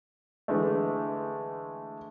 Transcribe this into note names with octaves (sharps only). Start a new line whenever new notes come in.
D3 E3 G#3 A3